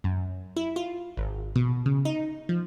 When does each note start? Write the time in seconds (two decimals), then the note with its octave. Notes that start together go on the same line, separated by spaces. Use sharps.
0.04 F#2
0.56 E4
0.76 F4
1.17 G#1
1.56 B2
1.86 C#3
2.05 D#4
2.49 F3